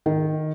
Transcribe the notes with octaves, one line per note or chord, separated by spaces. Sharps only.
D#3